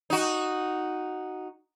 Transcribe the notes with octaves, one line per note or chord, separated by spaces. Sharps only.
D#4 F#4